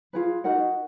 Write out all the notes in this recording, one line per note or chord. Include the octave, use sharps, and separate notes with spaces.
F4 G#4 B4
D#4 F#4 A#4 D#5 F#5